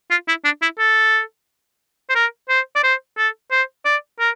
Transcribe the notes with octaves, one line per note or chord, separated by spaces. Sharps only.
F4
E4
D4
E4
A4
C5
A#4
C5
D5
C5
A4
C5
D5
A#4